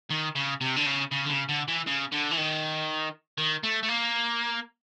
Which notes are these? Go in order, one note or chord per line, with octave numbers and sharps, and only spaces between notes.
D#3
C#3
C3
D3
C#3
C#3
D3
C#3
D3
E3
C#3
D3
E3
D#3
D#3
A3
A3
A#3